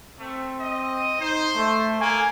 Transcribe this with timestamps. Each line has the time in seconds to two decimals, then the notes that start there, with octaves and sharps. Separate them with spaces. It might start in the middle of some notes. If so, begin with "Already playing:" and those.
0.19 A3 C4
0.60 D#5
1.21 D#4 C5
1.56 A3
2.01 A#3 G#5